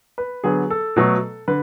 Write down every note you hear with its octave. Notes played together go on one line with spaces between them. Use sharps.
B4
D3 F#3 B3 G#4
A4
B2 F#3 A3
D3 B4